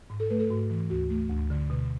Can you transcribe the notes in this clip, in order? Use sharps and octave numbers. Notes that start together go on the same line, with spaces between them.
G#2
A4
A3 B4
A4
G#2 F#4
E3
D2 F#4
A3
D2
D3
B2